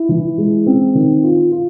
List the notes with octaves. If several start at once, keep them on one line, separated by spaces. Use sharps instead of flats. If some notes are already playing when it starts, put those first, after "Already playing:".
Already playing: E4
E3
G#3
C4
D#3
F4
F4